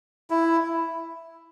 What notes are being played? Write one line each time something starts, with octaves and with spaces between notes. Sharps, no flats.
E4